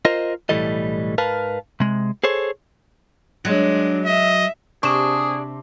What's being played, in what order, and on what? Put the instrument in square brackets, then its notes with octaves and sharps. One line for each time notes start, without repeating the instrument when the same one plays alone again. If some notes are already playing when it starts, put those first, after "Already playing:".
[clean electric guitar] F4 A#4 C5 D#5
B1 A2 E3 G3 A4 D#5
G#2 A#4 B4 F5 A5
C3 G#3
G#4 A4 C5 C#5
[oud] F#3 [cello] G#3 D4
[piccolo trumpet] D#5 [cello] E5
[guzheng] C3 [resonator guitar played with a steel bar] D4 [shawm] G#4 [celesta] C#6 E7